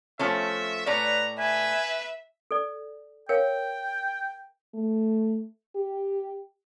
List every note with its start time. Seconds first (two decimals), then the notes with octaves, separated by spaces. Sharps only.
0.19 F3 A3 C#4 E5
0.86 A2 B4 C#5 D5 A#5
1.39 B4 E5 G#5
2.51 A4 D5
3.29 A#4 C#5 F5 G5
4.74 A3
5.75 G4